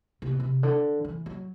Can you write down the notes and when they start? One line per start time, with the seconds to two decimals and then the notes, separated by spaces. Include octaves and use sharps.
0.22 C3
0.31 B2
0.40 C3
0.63 D3
1.05 E3
1.26 F#3